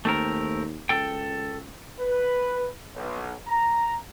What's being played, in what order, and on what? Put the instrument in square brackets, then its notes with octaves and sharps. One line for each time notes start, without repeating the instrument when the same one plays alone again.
[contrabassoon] D#2 [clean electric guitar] A3 C4 A#4
[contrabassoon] C#2 [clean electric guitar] A4 G5
[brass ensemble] B4
B1
A#5